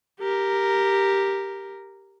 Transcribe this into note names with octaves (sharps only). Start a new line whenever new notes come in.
G4 A#4